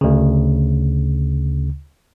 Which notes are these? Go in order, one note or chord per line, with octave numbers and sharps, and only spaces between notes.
D2 C#3